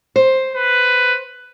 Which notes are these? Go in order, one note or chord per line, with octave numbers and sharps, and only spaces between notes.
C5
B4